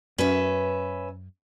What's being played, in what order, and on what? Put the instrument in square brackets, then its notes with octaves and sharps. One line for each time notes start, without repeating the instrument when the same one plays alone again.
[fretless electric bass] F#2 [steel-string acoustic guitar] C#4 B4 E5